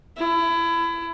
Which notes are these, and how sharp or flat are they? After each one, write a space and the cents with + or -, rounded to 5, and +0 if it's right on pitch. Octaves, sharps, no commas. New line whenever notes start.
E4 +25